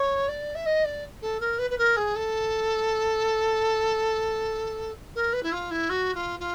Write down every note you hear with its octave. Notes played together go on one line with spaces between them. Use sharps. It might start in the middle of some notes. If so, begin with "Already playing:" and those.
Already playing: C#5
D5
E5
D#5
D5
A4
A#4
B4
B4
A#4
G#4
A4
A#4
B4
E4
F4
E4
F#4
F4
F4